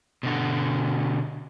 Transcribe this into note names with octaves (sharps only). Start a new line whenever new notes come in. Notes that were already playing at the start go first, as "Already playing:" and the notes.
B2 D3 F#4